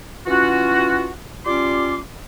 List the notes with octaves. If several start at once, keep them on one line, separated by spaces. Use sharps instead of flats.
E3 C#4 F4 F#4
G3 C#4 F4 C6 D6